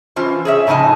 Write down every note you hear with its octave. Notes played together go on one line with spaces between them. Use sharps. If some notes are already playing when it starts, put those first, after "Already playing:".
E3 C#4 F4 C5
G#4 C#5 E5
A2 C#3 F3 D#4 G#5 A5